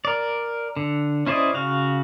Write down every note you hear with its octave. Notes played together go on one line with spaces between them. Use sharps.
A#4 D5
D3
C#4 E4 C5 D5 D#5
C#3 F#4 F5